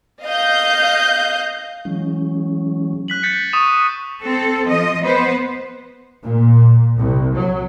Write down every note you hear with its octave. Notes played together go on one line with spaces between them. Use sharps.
D#5 F5 G6
E3 F#3 G#3 C#4
F#6 B6 F#7
G6 A6 B6 C#7
C#6 D#6 D#7 E7
C4 A4
F3 D#5
B3 B4 C5
A#2
C2
F#3